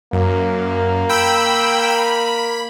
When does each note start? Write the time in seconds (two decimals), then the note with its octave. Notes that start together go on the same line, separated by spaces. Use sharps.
0.13 F#2 A#3
1.09 G5 B5 E6
1.90 B5